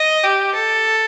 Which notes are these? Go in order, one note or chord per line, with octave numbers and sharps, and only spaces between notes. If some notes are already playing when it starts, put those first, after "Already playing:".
Already playing: D#5
G4
A4